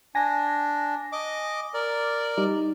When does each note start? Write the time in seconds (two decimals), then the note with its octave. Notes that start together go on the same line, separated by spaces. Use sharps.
0.15 D4 G#5 A#6
1.12 D#5 D6
1.74 A#4 D5
2.37 G3 D#4